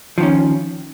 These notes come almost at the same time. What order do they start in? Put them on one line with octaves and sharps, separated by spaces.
F3 D#3 C#4